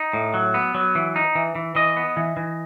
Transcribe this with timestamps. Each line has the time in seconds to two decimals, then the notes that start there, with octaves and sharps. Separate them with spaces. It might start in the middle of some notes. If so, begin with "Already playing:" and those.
Already playing: D#4
0.13 A2
0.34 F#3
0.54 B3
0.75 F#3
0.95 E3
1.16 D#4
1.35 E3
1.55 E3
1.75 E3 D#5
1.97 B3
2.17 E3
2.37 E3